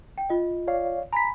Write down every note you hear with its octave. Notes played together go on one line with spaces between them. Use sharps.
G5
F4 D#5
C#5 D5 F5
G#5 A#5 B5 B6